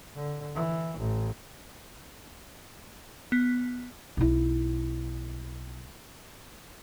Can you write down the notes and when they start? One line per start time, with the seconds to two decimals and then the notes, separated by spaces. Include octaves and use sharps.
0.15 D3
0.55 E3
0.98 A1
3.32 B3
4.17 B1 E4